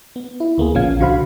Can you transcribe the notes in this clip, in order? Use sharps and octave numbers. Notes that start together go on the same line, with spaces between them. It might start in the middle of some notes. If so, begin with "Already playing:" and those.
B3
E4
D2 A#3 B3 G#4
A#1 F3 C#4 F5 G#6
C2 D3 F#4 C5 F5 B5